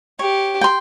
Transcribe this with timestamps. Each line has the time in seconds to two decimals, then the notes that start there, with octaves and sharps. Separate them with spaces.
0.19 G4 C#5
0.61 G5 C6